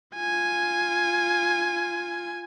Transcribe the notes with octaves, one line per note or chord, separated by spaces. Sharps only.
F4 G#5